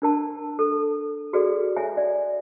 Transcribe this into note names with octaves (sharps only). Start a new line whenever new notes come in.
D4 A#4 A5
A4
F#4 G#4 A4 B4 D5
C#5 E5 G#5
D5